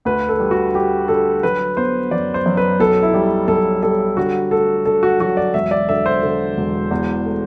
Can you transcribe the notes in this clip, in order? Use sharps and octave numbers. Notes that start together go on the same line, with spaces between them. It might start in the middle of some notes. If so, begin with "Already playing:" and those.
D2 B4
A4
G3
F#4
G3 G4
D3 A4
F#3 B4
B3 C5
F#2 D5
C5
F#2
B4
B1 A4
E4
G3
B1 A4
G3 A4
D3 F#4
A3 A4
D3 A4
F#4
F#3 F#4
D5
E1 E5
D5
D3 E5
C5
D3
E1
E2
A3